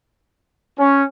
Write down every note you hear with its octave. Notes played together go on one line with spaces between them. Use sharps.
C#4